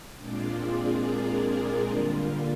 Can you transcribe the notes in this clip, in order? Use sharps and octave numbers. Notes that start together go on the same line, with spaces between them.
A#2 G#3 C4 D4 F4 D5
G#4
A#3 A#4
D3 G3 A#3 F4